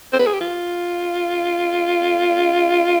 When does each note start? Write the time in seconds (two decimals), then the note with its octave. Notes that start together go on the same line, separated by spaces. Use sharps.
0.13 C5
0.19 B4
0.27 G#4
0.33 G4
0.41 F4